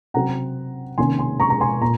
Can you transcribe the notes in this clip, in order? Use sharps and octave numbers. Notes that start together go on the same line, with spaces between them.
C3 F#3 C4 F#5 A#5
C3 D#3 A#3 C#4 G#5 C6
G#5 C6
A#5 C#6
A#5
G#5 C6
A#2 A#5